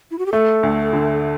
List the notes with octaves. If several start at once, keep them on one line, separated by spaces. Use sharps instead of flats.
E4
F#4
G4
A3 A4
D2
D3